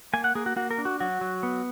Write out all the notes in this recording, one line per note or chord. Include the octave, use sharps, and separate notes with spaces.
A#3 G#5
F#5
A#3 G#4
F#4
A#3 F#4
A#4
D4
F#4
F#3 F#4
F#3
B3